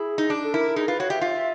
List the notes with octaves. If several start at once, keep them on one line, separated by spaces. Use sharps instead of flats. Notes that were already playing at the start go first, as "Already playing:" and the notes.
Already playing: E4 G#4
D#4
D4
A4
E4 A#4
D#4 G#4
F4 B4
F#4 C#5
G4 E5
F4